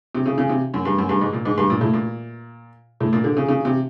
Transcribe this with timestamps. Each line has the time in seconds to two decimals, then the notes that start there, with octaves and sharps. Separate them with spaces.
0.15 C3
0.26 C#3
0.38 C#3
0.49 C3
0.74 F#2
0.85 G2
0.98 F#2
1.09 G2
1.21 G#2
1.33 A#2
1.45 G#2
1.58 G2
1.70 A#2
1.81 A2
1.94 A#2
3.00 A2
3.13 A#2
3.24 D3
3.37 C#3
3.48 C#3
3.65 C3